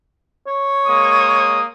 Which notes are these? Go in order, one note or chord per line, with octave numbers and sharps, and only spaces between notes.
C#5
G#3 A#3 D#6